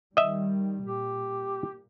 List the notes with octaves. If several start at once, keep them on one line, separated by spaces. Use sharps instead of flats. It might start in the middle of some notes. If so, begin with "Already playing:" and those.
D#3 G3 D#5 E5
A#2 G4